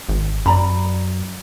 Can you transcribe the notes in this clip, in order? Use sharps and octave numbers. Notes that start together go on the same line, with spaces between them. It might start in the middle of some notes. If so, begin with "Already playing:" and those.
G#1
F#2 D5 A#5 B5